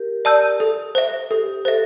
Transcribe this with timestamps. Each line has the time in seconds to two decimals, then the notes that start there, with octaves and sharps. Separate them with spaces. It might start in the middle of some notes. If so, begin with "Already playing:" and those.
Already playing: G4 A#4
0.25 D5 A5 E6 G6
0.60 A4
0.95 C5 E5
1.31 G4 A4
1.65 A4 C5 E5